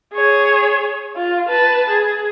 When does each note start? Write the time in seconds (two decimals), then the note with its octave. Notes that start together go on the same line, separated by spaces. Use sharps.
0.15 G#4 C#5
1.16 F4
1.48 B4 A5
1.90 G#4